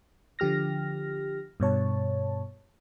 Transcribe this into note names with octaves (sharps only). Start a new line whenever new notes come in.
D3 F3 G4 F6 A#6
G2 B2 C#5 A5